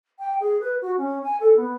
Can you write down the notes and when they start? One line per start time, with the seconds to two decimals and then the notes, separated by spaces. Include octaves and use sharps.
0.19 G5
0.40 G#4
0.60 B4
0.81 F#4
0.97 C#4
1.23 G#5
1.40 A4
1.56 B3